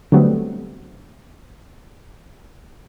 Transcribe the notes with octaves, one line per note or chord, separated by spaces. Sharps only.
D3 F#3 G3 A3 B3 C4